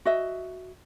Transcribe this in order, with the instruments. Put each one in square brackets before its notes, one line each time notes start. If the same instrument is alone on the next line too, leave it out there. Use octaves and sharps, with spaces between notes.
[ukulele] F#4 D#5 E5